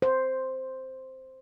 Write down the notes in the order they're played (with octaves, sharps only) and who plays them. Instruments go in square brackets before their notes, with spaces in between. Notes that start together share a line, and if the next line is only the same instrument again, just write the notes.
[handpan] C5